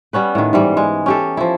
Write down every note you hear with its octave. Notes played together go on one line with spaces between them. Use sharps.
G3 B3 C#4 B4
A2 D#3
G#2 E3 G3
G#3
C#4 G4 A4
F3 E4